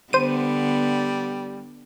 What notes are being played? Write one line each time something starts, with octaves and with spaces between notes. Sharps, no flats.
D3 G3 B3 C5 D#7